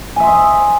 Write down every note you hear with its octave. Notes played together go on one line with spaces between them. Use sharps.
D#5 E5 G#5 C6